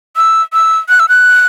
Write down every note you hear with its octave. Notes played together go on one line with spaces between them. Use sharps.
E6
E6
F#6
E6
F#6